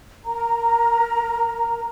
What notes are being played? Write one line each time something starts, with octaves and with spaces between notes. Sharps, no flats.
A#4 A#5